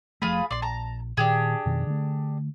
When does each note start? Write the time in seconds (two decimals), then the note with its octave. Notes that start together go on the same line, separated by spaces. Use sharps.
0.22 F1 F3 A3 F4 G#4 B5
0.51 A#1 D5 C6
0.62 A5 A#5
1.17 A#2 D#3 D4 G4 G#4
1.65 F2 B2 D#3
1.87 D3 A3